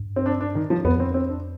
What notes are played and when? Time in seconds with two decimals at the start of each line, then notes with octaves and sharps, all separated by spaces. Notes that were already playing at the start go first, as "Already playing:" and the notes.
Already playing: G2
0.16 C4
0.26 D4
0.41 D4
0.55 D#3
0.70 F3
0.85 F2 B3
1.00 C4
1.14 C4
1.29 D4